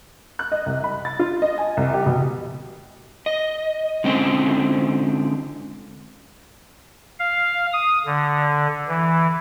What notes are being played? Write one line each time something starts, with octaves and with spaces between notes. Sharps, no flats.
F#6
D#5
C2
B5
A6
F4
D#5
G#5
C2
G4
B2
D#5
D3 G#3 C4 C#4 G5
F5
D#6
D3
E3